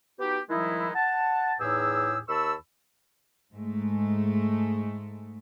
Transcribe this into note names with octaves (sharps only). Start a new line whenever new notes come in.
B3 D#4 F#4 G4
D#3 F3 G3 G#3 D#4 E4
F#5 A5
E2 A2 D#4 G4 G#4 E6
D#2 A5 B5 C#6 E6
G#2 G#3 A3